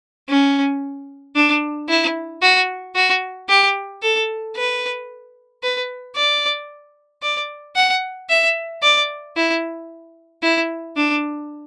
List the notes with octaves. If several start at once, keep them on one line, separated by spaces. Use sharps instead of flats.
C#4
D4
E4
F#4
F#4
G4
A4
B4
B4
D5
D5
F#5
E5
D5
E4
E4
D4